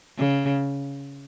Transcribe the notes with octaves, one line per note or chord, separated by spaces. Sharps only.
C#3